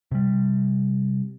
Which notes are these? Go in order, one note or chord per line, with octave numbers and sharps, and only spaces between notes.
C3 G3